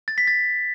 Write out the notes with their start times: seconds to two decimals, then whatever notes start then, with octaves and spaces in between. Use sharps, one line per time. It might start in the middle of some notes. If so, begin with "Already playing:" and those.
0.08 A6
0.18 B6
0.27 A6